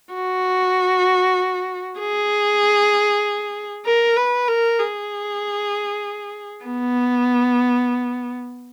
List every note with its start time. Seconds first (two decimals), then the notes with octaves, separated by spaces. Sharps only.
0.13 F#4
1.99 G#4
3.85 A#4
4.16 B4
4.48 A#4
4.79 G#4
6.65 B3